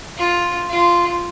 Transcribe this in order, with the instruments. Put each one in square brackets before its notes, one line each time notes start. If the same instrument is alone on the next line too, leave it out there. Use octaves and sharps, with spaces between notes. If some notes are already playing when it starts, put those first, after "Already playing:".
[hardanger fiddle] F4
F4